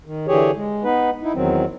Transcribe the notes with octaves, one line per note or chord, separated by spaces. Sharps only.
D#3
D3 E3 G4 G#4 C#5
G#3
B3 D#4 B4
D#4 E4
E2 D#3 F#3 C4